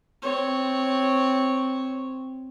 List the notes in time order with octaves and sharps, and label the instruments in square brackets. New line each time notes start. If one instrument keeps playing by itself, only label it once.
[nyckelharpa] C4 C#5